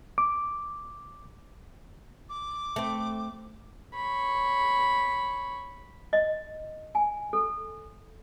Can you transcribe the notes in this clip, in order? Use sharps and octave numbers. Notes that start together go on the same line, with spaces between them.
D6
D6
A3 C4
C#5 B5
D#5
G#5
A4